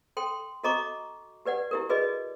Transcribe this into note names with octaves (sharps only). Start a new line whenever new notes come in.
A4 G5 C6
F#4 A4 D#5 A#5 C#6 D6
G4 B4 D5 F#5
E4 G4 A#4
F#4 G#4 B4 D5 D#5